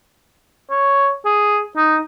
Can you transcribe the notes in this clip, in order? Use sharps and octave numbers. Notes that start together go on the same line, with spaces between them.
C#5
G#4
D#4